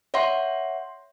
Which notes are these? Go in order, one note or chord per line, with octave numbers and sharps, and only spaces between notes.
C#5 E5 F#5 C6